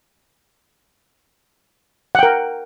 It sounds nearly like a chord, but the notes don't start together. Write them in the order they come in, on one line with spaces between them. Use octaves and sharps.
F#5 G5 A#4